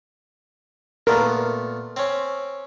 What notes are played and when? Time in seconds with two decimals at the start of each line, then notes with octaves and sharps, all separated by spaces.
1.07 A#2 A3 B3 A#4
1.96 C4 C#4